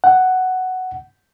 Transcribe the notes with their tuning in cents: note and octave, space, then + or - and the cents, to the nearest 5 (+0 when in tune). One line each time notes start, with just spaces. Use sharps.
F#5 +5